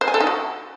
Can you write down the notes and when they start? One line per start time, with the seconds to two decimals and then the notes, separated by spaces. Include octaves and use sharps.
0.01 C5
0.08 G#5
0.14 A4
0.20 D#4
0.27 F#4